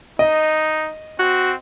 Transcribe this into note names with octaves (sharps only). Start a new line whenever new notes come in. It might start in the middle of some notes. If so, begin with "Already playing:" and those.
D#4 D#5
C4 F#4